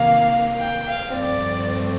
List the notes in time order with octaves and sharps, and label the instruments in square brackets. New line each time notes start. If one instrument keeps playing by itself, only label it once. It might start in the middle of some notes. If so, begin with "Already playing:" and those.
Already playing: [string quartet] C3 D#3 A#3 F5
G5
F5
G2 F3 A3 C4 D5